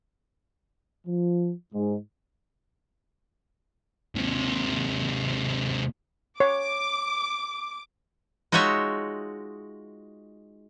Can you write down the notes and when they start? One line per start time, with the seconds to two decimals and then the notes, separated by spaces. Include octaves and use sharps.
1.07 F3
1.74 G#2
4.15 D#2 C3
6.40 C#5 D6
8.52 G#3 D#4 F4 F#4 C#5 E5